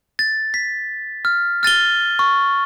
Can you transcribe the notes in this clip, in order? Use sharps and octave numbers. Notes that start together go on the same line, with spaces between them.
A6
B6
F6
F6 A6 D#7 G7
C#6